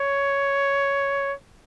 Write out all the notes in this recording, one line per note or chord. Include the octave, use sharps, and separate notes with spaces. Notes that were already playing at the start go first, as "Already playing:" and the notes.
Already playing: C#5